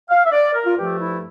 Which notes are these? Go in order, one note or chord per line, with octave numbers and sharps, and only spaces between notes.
F5
E5
D5
A#4
F4
G2 F3 A3 G4
E4